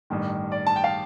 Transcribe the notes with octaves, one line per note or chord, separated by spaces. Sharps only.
A1 G2 D#3
D5
A5
G5
F5